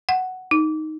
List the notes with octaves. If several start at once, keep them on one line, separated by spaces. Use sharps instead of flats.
F#5
D#4